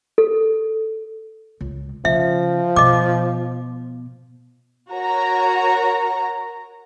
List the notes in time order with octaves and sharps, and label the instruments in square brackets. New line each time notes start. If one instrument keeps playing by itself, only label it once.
[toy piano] A4
[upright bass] C#2
[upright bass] C#3 [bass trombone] F3 [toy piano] E5
[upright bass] B2 [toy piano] D#5 D6
[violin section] F#4 A#4 C#5 A#5